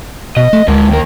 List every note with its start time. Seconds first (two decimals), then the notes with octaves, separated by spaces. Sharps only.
0.37 B2 D#5
0.53 A3
0.68 D2 G#3 A#4
0.89 D#2 A#4